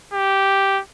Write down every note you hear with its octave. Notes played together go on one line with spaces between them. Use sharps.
G4